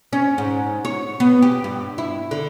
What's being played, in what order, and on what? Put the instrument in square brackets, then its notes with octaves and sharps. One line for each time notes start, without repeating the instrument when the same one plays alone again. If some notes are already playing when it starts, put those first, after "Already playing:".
[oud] C#4
G#2
C#5
B3
G4
G2
E4
D3